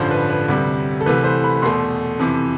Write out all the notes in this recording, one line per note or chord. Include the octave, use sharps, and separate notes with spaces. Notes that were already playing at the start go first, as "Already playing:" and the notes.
Already playing: A1 G2 D3 F3 C5
B4
B4
D2 C3 G3
A4
C2 C3 E3 A3 B4
C5
B5
E2 B2 A3 C6
F2 C3 E3